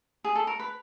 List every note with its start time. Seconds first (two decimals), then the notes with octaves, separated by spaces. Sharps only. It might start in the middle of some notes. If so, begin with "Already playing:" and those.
0.24 G#4
0.35 A4
0.47 A#4
0.60 B4